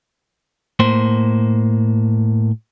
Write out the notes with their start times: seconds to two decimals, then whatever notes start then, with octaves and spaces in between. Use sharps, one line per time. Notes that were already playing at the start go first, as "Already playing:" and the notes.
0.79 A2 A#3 C5